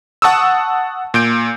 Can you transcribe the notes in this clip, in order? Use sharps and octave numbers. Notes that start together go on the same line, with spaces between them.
F#5 A5 C#6 D#6 E6
A#2 G6 D7